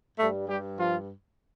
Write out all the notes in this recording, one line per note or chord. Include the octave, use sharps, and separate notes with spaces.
G2 G3 A3 A4
G3 G4
F3 F4